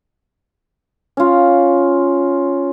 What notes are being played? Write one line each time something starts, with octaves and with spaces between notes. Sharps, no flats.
C#4 F4